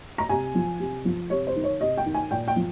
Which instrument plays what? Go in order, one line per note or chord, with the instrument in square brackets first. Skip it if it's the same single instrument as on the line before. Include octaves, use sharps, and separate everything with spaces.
[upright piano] A#5
C3 G#5
F3
C3
F3
C3 C#5
C5
D#3
C#5
C3 D#5
G5
D#3
G#5
A#2 G5
G5
F3